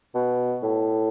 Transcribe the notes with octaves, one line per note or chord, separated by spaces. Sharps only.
B2
A2